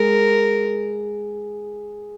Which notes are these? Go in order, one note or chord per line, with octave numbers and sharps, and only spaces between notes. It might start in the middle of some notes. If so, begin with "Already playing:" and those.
Already playing: G#3 A#4